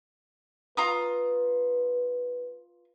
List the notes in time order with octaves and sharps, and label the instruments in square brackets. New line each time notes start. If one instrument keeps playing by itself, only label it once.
[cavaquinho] F4 A#5 D#6 [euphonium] B4